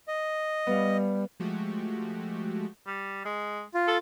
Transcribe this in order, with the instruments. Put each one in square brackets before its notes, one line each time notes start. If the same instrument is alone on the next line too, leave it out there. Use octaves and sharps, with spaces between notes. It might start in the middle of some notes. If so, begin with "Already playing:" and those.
[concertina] D#5
[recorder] G3 [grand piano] B3 F5
[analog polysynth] F3 G#3 A3 F#4 G4
[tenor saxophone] G3
G#3
[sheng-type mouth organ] F4
[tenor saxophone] A4